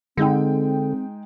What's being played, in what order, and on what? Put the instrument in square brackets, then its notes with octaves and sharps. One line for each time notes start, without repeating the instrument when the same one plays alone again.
[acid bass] D3 [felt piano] G#3 D#4 G5 [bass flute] C4